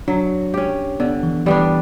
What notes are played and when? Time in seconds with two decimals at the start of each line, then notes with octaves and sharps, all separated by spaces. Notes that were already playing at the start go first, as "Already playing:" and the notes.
0.08 F#3 D4
0.54 C#4 G4
1.00 D3 B3
1.23 E3
1.46 E3 G3 B3 D4